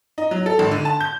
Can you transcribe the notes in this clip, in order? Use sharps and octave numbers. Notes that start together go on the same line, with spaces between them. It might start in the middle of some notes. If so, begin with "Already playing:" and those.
D#4
F#3
A4
G#1
D3
A5
G6